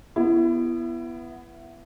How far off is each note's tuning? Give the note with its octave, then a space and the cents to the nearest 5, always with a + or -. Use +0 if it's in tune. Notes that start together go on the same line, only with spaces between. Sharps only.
B3 +0 E4 +25